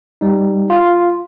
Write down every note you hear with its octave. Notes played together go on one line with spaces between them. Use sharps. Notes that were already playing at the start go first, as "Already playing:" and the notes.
G3 D#4
F4